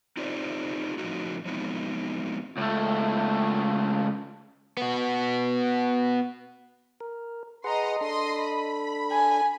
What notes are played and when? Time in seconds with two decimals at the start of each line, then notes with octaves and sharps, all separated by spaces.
0.17 C4 D#4 F4 G4 C5 D5
0.98 A2 F3 G#3 C4 D#4 F#4
1.45 F3 F#3 G#3 B3 C4 D#4
2.58 C#2 A3
4.77 B3 F#4
7.00 A#4
7.64 G#4 B4 D#5 F#5 A#5 C6
8.01 D4 A4 D#5 C6
8.43 B5
9.12 G#5